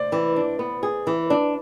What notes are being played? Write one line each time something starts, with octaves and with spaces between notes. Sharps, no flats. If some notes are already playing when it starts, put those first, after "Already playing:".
Already playing: C5 D5
E3
D4
B3
G#4
E3
D4